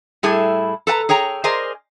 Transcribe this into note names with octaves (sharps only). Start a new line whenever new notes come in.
A2 G3 E4 G#4 A4
A4 B4 F#5 A#5
G#4 C#5 G5 A#5
G#4 A#4 C5 D5 D#5 G#5